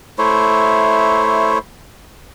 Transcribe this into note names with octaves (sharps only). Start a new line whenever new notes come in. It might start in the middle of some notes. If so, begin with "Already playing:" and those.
A3 E4 C5 C#5